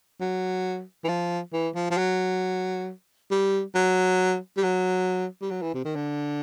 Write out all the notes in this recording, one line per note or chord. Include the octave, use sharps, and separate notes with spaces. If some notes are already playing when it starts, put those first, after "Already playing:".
F#3
E3
F3
E3
F3
F3
F#3
G3
F#3
G3
F#3
G3
F#3
E3
C3
D#3
D3